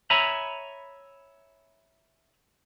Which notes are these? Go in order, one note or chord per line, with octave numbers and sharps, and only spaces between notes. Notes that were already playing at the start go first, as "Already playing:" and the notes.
C#5 E5 G#5 A#5 B5